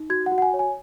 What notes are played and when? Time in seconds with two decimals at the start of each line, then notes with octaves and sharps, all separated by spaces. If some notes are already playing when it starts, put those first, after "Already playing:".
Already playing: D#4
0.10 F#4 G#6
0.26 F#5
0.32 F#4
0.38 F#5
0.42 G#5
0.53 C#5
0.59 G#5